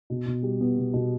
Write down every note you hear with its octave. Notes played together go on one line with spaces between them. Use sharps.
B2
B2
G3
B3
B2
B2